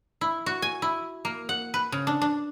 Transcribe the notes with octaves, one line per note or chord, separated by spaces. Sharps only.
E4
F#4
G#5
E4
A#3
F#5
B4
C#3
D4
D4